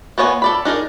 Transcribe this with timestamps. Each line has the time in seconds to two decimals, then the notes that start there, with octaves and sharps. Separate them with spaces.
0.18 A#3 B3 C#5 D#5 G#5
0.42 A4 D5 B5
0.65 D4 D#4 G#4 A#4